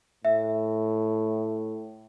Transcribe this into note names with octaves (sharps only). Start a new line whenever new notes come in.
A2 E5